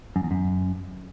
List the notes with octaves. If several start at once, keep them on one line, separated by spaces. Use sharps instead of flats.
F#2
E2
F#2